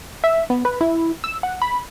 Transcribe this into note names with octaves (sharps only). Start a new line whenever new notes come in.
E5
B3
B4
E4
E6
F#5
B5